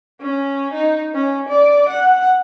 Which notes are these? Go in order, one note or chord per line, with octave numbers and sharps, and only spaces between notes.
C#4
D#4
C#4
D5
F#5